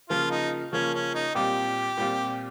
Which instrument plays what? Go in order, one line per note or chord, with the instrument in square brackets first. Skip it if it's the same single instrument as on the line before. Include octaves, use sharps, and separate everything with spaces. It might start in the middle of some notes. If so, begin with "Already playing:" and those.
[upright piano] C#3 F3 A#3 [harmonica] F4
[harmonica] D#4
[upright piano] C#3 F3 A#3 [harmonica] C#4
[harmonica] C#4
D#4
[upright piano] A#2 G3 C4 F4 [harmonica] G4
[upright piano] A#2 G3 C4 F4